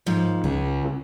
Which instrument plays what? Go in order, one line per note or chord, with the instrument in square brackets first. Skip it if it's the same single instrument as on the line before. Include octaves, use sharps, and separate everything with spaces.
[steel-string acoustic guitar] D#2 G#2 F3
[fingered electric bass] C#2 [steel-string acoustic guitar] G#4